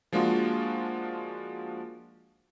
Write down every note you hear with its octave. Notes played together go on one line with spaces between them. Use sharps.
F3 G#3 A#3 D4 F4 F#4